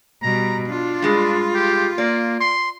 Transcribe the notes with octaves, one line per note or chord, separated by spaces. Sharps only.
B2 G3 A#5
D4 F4
G2 G#3
G4
A#3 D5
C6